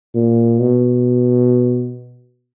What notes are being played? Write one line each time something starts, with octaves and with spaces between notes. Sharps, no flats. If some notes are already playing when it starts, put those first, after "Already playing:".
A#2
B2